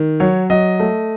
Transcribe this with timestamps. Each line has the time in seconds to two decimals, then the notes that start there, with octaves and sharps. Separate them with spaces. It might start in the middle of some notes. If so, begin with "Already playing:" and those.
Already playing: D#3
0.20 F#3 C#5
0.50 F#3 D#5
0.80 A3